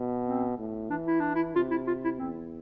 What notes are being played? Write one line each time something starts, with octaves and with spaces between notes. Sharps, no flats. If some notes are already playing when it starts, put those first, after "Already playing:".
Already playing: B2
C4
A2
E3 D4
E4
D4
E4
C3 F4
E4
F4
E4
E2 C4